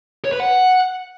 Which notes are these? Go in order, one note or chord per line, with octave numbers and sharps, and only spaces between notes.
C#5
B4
F#5